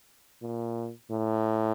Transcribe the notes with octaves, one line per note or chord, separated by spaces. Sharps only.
A#2
A2